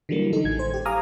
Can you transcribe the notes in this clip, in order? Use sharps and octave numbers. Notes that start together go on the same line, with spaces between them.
D3 E3 F#3 G3 A#3
D3 D#4 A4
A1 G#6
C5
G4
F5 G#5 A#5 D6 D#6 F6